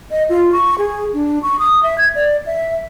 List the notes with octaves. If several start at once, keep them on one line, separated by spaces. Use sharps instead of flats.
D#5
F4
C#6
G#4
D4
C#6
D#6
E5
G#6
D5
E5